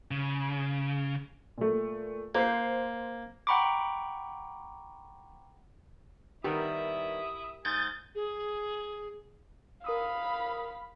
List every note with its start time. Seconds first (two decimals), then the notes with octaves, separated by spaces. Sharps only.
0.11 C#3
1.58 A#2 A3
2.35 A#3 C5 G6 C7
3.47 F#5 G5 A#5 B5 C#6 D6
6.44 D#3 G3 B3 E4 G4 A#4 E5 D#6
7.65 G#2 G#5 D#6 G6 A6
8.15 G#4
9.84 A#4 F5 B5 D#6 E6